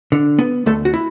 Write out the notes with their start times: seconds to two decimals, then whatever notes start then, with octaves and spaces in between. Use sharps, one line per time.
0.12 D3
0.39 B3
0.66 D2 A3 A4
0.85 F#4
0.94 E4